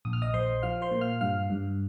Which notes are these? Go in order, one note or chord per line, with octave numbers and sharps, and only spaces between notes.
A#1 D#6
F6
D#5 D#6
A#1 C5 C6
F3 F5 F6
C5 C6
A#2
F5 F6
G2 F5 F6
G2